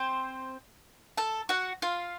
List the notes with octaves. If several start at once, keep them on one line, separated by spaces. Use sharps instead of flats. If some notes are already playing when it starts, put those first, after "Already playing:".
Already playing: C4 C5
A4 A5
F#4 F#5
F4 F5